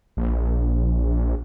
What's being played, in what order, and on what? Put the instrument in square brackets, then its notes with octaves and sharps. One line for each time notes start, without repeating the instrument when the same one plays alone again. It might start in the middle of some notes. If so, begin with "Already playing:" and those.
[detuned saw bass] A#1